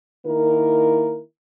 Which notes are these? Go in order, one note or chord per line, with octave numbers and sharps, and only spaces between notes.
D#3 A#3 E4 A#4